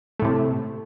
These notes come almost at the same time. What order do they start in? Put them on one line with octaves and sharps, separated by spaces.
A3 A2 C3